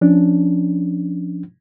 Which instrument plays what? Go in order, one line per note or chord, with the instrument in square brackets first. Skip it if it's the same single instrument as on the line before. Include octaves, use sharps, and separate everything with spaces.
[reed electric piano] F3 C#4 D4